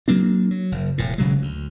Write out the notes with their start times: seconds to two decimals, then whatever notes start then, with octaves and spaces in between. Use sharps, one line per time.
0.08 F#3 A#3 C4 D4
0.51 F#3
0.72 F#1
0.98 E1 A2
1.18 D#1 C#3 F#3 G#3
1.42 D2